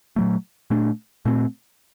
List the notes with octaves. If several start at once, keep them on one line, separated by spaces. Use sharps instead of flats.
A#2 F#3 A3
A#2 A3 D4
A#2 A3 C4